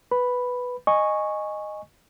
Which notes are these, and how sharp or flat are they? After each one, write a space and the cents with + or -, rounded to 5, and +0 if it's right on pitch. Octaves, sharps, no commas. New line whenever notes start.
B4 +0 B5 +0
D#5 -10 G#5 -5 C#6 -5